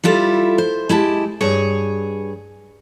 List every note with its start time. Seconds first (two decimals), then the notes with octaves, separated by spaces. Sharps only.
0.04 G3 E4 F4 A4
0.58 C5
0.89 G#3 E4 G4 A5
1.41 G2 G#4 C#5